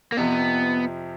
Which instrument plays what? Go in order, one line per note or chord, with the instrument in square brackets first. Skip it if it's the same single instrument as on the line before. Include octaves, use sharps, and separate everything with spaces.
[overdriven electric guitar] A#3
[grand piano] F2 C3 F3 [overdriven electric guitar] B3